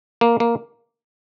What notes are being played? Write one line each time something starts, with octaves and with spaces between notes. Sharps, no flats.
A#3
A#3